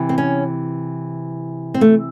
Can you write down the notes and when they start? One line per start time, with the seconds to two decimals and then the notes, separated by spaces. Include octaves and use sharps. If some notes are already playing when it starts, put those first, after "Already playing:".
Already playing: C3 E3
0.09 C4
0.18 C#4
1.74 C4
1.81 A3